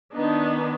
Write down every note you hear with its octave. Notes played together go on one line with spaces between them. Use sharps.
D#3 B3 D4 D#4